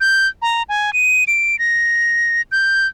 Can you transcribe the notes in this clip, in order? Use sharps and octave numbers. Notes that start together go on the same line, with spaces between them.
G6
A#5
G#5
D#7
D7
A#6
G6